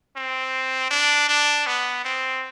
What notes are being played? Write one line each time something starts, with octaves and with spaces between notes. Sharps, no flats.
C4
D4
D4
B3
C4